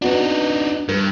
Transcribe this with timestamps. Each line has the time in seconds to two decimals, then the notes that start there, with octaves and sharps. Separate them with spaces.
0.02 B3 D4 D#4 F#4
0.89 G2 A#4